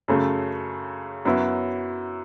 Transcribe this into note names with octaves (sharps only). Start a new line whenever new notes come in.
F#2 C#3 A3
F#2 F#3 B3 E4